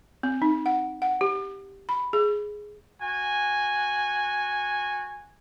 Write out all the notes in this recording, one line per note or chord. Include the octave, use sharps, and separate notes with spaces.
C4
D#4
F#5
F#5
G4
B5
G#4
F#4 G#5